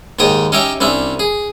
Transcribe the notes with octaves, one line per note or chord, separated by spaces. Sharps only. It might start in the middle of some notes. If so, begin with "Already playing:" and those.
D#2 G#2 C#5 G5 D#6
C#4 D#4 G4 C#5 E5 G5
C2 C#4 D4 E5
G#4